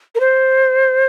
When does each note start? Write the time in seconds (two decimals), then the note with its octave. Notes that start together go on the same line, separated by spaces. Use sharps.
0.15 A#4
0.20 C5